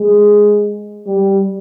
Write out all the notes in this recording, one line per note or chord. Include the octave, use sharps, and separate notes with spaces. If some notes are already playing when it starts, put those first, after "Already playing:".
Already playing: G#3
G3